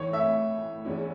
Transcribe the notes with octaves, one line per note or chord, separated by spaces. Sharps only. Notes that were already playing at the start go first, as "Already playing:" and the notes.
Already playing: A2 E3 A3 C#5
E5
E2 E3 C#4 E4